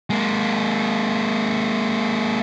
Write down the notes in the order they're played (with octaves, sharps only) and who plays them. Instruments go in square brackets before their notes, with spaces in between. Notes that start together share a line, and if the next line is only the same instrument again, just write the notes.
[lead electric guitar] G#3 A#3